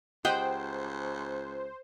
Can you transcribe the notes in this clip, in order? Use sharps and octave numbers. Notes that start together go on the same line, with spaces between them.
C#2 G4 C5 D#5 F#5 G5